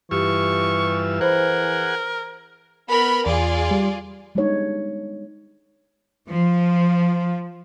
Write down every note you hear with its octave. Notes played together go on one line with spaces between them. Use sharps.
G2 E3 F4 G4 C#6 E6
G#4 A#4 C5 F#5 B5
B3 A#4 B5
E2 F4 G#4 D5
G3
G3 G#3 B3 D4 D#4 C#5
F3